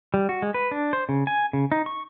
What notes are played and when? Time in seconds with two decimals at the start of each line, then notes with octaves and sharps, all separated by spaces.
0.14 G3
0.29 F#4
0.42 G#3
0.54 B4
0.71 D4
0.93 C5
1.09 C#3
1.27 G#5
1.53 C#3
1.72 D#4
1.86 C#6